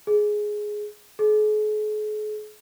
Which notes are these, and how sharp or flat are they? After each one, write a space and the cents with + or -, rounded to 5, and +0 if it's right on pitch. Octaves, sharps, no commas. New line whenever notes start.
G#4 +10
G#4 +45